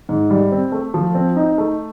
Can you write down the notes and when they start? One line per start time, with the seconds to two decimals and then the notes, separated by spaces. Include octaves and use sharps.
0.09 G#2
0.30 G3
0.52 C4
0.72 A3
0.94 F3
1.15 C4
1.36 D#4
1.58 A3